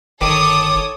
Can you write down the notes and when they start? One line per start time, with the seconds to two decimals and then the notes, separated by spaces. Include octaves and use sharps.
0.21 G1 D#3 A4 C#5 D6 D#6